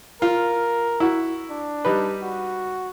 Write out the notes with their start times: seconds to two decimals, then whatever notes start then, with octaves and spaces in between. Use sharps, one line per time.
0.22 F4 A#4
1.00 E4 F#4
1.50 D4
1.85 G3 D#4 B4
2.22 F#4